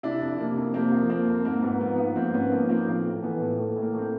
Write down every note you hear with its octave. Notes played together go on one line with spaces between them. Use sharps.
C3 D4 E4
F2
C3 A#3
F2
C3 A#3 C4
F3
F2 A#3 C4
F2
G#2 A#3
G#2 B3
F3 B3
F3 B3
G#2 A#3 C4
G#2 B3 C#4
F3 A#3 C4
F3 A#3 C4
A2 A#3
A2
E3 B3
A2
A2 A#3
A2
A#3
A2 C4